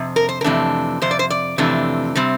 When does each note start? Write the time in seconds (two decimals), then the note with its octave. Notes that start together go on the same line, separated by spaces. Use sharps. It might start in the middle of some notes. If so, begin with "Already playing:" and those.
Already playing: F2 C3
0.16 A#4
0.29 C5
0.41 A#4
0.44 F2 C3 E3 A3 D4
1.02 F2 C3 C5
1.11 D5
1.19 C5
1.30 D5
1.58 F2 C3 E3 A3 D4
2.15 C3 G3 C4